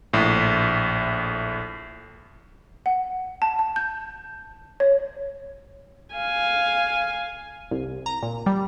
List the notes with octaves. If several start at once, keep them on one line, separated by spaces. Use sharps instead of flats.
A#1 A2
F#5
A5
A5
G6
C#5
F5 G#5
C2
A#5
A#2
G3